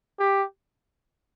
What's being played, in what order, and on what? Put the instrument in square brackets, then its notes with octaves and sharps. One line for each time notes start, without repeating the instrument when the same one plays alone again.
[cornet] G4